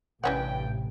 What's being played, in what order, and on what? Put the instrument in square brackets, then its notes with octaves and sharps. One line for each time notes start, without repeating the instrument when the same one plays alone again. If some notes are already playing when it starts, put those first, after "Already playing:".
[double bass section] A1 [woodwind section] G2 G5 [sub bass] C3 [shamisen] E3 C#4 F#5